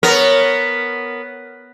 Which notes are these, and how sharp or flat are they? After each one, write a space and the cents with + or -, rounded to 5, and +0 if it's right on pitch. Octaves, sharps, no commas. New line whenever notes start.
B3 +0 A#4 -5 C#5 +0